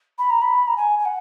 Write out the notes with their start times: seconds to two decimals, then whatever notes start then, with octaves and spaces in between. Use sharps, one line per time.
0.18 B5
0.30 A#5
0.41 B5
0.67 A#5
0.76 G#5
0.99 G#5
1.05 F#5